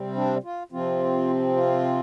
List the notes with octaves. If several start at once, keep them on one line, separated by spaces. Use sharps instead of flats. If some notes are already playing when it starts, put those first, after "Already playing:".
Already playing: C3 G3 C4
D4
F4
C3 F3 C4 F4
F4